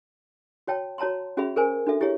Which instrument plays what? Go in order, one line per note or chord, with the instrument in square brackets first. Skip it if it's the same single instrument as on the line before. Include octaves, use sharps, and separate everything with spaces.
[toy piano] F#4 C#5 G5 A5
F#4 C#5 A5 A#5 C6
C#4 F#4 G#4 E5 B5
G#4 A#4 C5 G#5
D4 F#4 A4 E5
E4 G4 G#4 C#5 E5